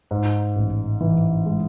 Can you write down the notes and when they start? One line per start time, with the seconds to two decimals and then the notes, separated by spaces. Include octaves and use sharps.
0.11 G#2
0.56 A1
1.00 E3
1.46 G#3